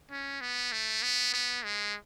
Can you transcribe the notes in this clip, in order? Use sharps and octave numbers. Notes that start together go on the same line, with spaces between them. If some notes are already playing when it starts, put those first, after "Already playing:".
C#4
B3
A3
B3
B3
G#3